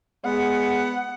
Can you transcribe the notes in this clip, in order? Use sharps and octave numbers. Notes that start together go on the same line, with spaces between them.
G#3 B3 F#5